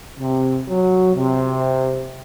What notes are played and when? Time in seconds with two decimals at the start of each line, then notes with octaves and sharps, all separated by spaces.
0.20 C3
0.69 F#3
1.15 C3